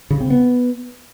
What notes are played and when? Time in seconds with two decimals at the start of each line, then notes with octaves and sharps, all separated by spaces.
0.10 C#3
0.20 C4
0.30 B3